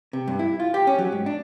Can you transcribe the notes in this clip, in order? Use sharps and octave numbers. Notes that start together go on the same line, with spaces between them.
C3
G2
E4
F4
G4
C#4
F#3
G#2
D4